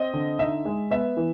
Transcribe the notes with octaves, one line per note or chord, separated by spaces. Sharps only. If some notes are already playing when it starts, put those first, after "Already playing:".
Already playing: C4 D#5
D3
D#4 E5
G#3
B3 E5
E3